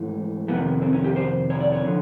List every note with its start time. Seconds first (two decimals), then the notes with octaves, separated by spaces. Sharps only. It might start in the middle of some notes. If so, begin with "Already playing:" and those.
Already playing: G#2 E3 A3
0.48 F2 C3 D#3 B3
0.82 C4
0.93 C#4
1.04 G4
1.16 C5
1.50 C#5
1.61 D5
1.72 C#5
1.85 D3 F3